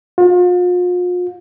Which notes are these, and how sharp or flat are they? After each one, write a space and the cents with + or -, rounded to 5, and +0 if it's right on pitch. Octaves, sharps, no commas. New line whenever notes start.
F4 +40